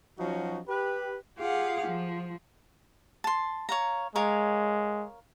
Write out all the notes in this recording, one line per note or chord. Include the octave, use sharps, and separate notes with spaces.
F3 F#3 C#4 D#4 F#4
G4 B4
F4 G4 G#4 F5 F#5
F3
A5 C6
C#5 F5 A#5
G#3 A#4 C#5 F5